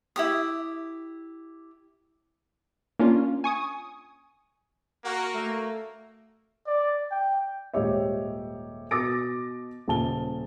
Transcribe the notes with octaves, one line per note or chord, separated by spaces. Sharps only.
E4 G4 D#6
A#3 C#4 D4 F4
G#5 C#6 D#6
A#3 F#4 A#4 F#5
A3
D5
G5
D#1 G#2 G4 C#5 D#5 E5
B2 D6 D#6 A6 A#6 D7
D#1 C#3 A5 G7